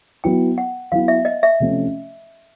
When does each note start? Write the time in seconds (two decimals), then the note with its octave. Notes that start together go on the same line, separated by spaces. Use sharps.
0.24 F#3 B3 E4 G5
0.58 F#5
0.92 F#3 B3 E4 F5
1.08 E5
1.25 D#5
1.43 E5
1.60 C3 F3 A3 C#4